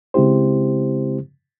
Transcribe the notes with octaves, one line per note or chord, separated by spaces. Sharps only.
C#3 G#3 C4 E4 G4 C5